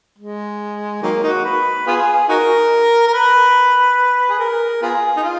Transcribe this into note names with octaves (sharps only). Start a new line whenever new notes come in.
G#3
D#3 F#3 A#3
A#3 D#4 F#4
B4
B3 F4 G#4
D#4 F#4 A#4
A#4
B4
G#4
A#4
B3 F4 G#4
D#4
F4